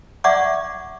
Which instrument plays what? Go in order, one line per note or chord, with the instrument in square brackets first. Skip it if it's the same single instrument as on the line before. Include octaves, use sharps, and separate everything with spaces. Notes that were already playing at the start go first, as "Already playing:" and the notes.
[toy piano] D5 E5 F#5 C#6 D6